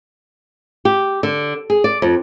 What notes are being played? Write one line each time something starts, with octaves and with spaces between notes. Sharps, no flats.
G4
D3
G#4
D5
F2